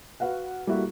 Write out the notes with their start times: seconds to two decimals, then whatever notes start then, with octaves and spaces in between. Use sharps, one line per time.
0.20 F#4 B4 F5 F#5
0.67 G3 A#3 E4 F#4 A4